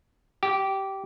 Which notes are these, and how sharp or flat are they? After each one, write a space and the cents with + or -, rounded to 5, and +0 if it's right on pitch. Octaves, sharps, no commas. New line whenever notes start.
G4 -15